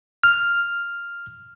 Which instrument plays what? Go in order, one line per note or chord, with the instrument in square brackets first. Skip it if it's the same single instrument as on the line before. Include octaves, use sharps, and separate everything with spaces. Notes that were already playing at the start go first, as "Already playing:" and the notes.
[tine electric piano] F6